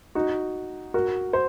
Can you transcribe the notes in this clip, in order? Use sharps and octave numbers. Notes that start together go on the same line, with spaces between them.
D#4 F#4
F#4 A#4
C5